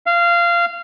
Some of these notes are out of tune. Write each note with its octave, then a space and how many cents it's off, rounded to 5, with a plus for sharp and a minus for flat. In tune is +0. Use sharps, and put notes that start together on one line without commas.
F5 -20